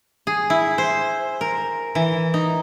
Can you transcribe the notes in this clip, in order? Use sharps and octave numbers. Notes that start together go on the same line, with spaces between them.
G#4
E4
C5
A#4
E3
D#4